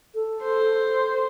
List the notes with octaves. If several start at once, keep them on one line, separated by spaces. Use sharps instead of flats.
A4
C5